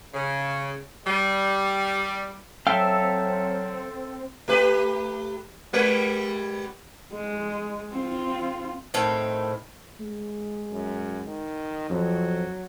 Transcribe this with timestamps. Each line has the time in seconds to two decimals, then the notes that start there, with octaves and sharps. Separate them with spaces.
0.13 C#3
1.06 G3
2.67 F#3 C4 A4 E5 F5 G5
4.48 A3 G4 B4
5.73 G3 G#3 B4
7.13 G#3
7.93 C4 F4
8.94 A2 D#3 C4
10.00 G#3
10.71 F#2
11.26 D#3
11.90 F2 F#3